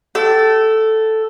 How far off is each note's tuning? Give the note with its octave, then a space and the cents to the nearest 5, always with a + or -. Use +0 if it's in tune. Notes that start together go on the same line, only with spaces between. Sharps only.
A4 +0 G5 -35